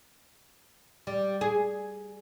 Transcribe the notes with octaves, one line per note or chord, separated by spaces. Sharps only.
G3
G#4